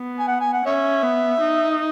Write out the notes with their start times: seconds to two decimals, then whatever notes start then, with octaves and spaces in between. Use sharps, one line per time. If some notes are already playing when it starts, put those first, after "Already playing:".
Already playing: B3
0.19 G#5
0.28 F#5
0.40 G#5
0.53 F#5
0.66 C#4 C#5 E5
1.03 B3
1.41 D#4
1.71 E5